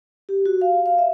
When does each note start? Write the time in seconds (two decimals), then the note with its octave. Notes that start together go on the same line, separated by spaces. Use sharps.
0.29 G4
0.46 F#4
0.61 F5
0.86 F5
0.98 E5